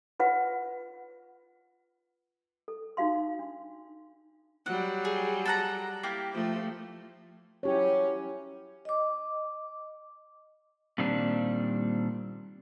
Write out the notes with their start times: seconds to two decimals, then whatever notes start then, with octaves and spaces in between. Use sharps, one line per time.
0.20 F4 B4 F#5
2.68 A4
2.97 D#4 F#4 F5 C6
3.39 D4
4.66 F#3 G3 F#5
5.05 G#4
5.45 A4 F#5 A#5
6.03 A#3 E4 G4
6.34 F3 A3
7.63 F#3 C#4 E4 G4 C#5
8.85 D#5 D6
10.98 A#2 D#3 G3 C4 D4